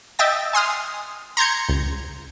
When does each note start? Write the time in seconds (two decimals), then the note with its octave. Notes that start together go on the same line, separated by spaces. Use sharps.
0.19 D#5 E5 G5 A6
0.53 G#5 C6 D#6 F6
1.37 A#5 C6 G6 G#6 C#7
1.69 C#2